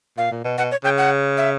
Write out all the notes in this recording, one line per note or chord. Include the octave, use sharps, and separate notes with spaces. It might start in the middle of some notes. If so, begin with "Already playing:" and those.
A#2 F5
A#2
B2
B2 F#5
C#5
C#3 G5
F#5
E5